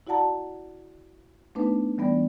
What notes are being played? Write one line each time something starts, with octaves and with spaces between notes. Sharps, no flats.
E4 F#4 D5 F#5 A5 A#5
A3 B3 D4 D#4 B4
E3 G3 B3 D4 D5